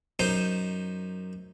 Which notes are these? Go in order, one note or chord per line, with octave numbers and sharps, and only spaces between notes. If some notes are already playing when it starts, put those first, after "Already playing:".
F#2 D#4 C5